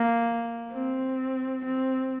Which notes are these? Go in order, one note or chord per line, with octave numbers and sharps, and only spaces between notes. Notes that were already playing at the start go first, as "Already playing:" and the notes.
Already playing: A#3
C4
C4